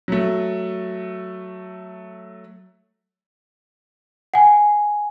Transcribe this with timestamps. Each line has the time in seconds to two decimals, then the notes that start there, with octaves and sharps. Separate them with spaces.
0.08 F#3 A3
4.34 F#5 G#5